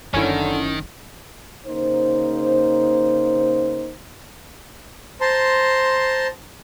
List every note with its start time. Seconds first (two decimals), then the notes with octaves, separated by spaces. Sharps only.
0.14 F#1 D3 D#3 C4 C#4 E4
1.67 C#3 A#3 D#4 C5
5.21 C5 A5 A#5 C6